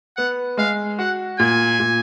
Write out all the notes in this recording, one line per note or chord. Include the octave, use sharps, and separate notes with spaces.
B3 F#5
G#3 F5
F#4 F#5
A#2 G#5
A#2